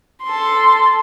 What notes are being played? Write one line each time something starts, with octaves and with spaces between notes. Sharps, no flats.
A4 C6